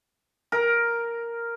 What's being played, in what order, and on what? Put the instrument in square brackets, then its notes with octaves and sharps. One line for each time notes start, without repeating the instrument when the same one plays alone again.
[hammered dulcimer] A#4